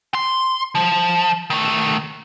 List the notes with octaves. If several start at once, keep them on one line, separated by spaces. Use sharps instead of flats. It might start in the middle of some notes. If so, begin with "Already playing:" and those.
C6
F3
D#3 A3